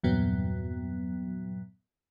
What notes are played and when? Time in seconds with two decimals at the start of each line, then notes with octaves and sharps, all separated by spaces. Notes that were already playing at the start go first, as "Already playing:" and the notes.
0.03 E2 G2 A#2 F#3 B3